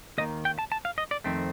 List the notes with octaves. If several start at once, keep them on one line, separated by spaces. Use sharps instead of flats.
D#2 D#3 A#3 D#5
G5
A5
A5
F5
D#5
D5
F2 D#3 A3 C4